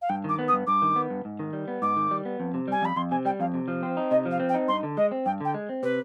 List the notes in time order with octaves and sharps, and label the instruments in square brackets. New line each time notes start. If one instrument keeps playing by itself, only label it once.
[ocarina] F5
[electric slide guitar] G2 [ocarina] G5
[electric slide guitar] D#3 [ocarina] D6
[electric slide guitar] B3
[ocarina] D#6
[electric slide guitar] G2
[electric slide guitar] G2 [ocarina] D6
[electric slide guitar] D#3
B3
G2
G#2
D#3
G3
B3
[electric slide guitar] G#2 [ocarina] D6
[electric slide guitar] D#3
G3
B3
F2
C3
[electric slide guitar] G3 [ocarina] G#5
[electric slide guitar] F2 [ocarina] B5
[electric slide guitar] F2 [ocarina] C6
[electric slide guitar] C3 [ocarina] G#5
[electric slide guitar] G3 [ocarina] G5
[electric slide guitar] F2 [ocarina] F5
[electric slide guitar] C3
F3
C4
D#4
[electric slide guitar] C3 [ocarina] D#5
[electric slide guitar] F3
[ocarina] F5
[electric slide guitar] C4
[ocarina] G5
[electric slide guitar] D#4
[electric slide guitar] G2 [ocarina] C6
[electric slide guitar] D3
[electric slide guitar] G#3 [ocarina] D#5
[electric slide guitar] C4
[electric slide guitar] G2 [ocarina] G5
[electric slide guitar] D3 [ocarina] G5
[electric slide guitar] G#3
C4
[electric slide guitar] C3 [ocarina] B4